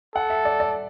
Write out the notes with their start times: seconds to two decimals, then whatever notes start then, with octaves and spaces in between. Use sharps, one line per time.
0.15 A4 F#5
0.30 E5
0.45 D5
0.60 D5